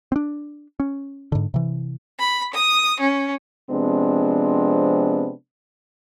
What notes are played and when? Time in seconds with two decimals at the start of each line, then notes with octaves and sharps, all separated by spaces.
0.12 C4 D4
0.80 C#4
1.32 G#2 D3
1.54 C3 E3
2.20 B5
2.54 D#6
3.01 C#4
3.70 C3 F3 G#3 B3 C4 D4